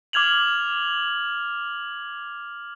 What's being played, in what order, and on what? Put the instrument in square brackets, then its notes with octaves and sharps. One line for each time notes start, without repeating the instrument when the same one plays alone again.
[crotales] D6 F6 G#6 F7 F#7